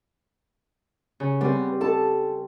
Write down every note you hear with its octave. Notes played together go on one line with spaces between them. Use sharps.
C#3
G3 B3 C4
A4 A5